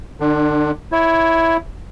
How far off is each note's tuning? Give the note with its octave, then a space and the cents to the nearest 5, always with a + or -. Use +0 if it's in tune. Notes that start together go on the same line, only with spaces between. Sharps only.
D3 +45 D4 +5
E4 +0 C#5 +0